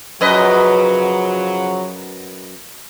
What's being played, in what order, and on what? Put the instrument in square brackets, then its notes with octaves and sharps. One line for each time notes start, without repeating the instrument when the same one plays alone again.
[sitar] F#2 B4 D#5 [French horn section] C#3 F3 F#3